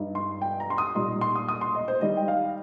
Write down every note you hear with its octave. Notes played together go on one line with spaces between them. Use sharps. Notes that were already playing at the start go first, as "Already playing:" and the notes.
Already playing: G2 G3 D#4
C6
G5
A#5
C6
D#6
A#2 G3 D#4 C6
C6
D#6
D#6
C6
D#5
C5
D#3 G3 D#4 D#5
G5
F5